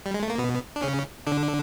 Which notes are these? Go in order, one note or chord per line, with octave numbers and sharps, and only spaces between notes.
G3
G#3
A3
A#3
B2 B3
D4
C#3 C#4
D3 D4